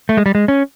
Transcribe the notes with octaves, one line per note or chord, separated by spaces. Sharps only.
A3
G#3
G3
G#3
C#4